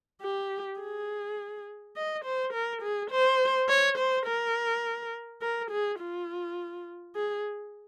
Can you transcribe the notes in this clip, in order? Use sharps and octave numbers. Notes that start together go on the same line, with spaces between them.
G4
G#4
D#5
C5
A#4
G#4
C5
C#5
C5
A#4
A#4
G#4
F4
G#4